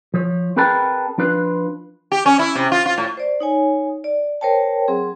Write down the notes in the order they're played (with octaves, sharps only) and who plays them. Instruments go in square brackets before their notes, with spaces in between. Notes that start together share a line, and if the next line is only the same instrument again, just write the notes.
[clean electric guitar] F3 C#5
C4 G#4 A#4 B4 G5 A5
F3 D4 F4 B4
[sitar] G4
C#4
E4
C3
F4
F4
A2
[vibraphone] C5 D5
D#4 C#5 G#5
D5
A#4 C5 C#5 G5 A5
F#3 C4 G#4